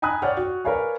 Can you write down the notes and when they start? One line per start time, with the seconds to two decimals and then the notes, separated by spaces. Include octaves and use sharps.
0.02 G5 G#5 A#5 B5 D#6 F#6
0.22 C#5 D5 F#5 G5 F6
0.37 F#4
0.65 A#4 B4 C#5 D5 F5 G#5